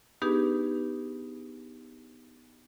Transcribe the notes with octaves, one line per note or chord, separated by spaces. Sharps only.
B3 D4 D#4 G4 G#4 B4